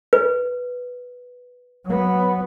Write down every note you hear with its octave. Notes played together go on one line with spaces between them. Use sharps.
B4
F#3 B3